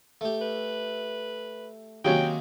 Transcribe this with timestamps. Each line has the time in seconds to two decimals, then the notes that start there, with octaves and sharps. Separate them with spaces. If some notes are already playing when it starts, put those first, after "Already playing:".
0.21 A3 G4
0.41 B4
2.05 C3 D#3 F#3 A#3 C#4 G#4 G5